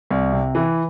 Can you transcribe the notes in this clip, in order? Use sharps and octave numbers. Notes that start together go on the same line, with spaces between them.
C2
C3
E3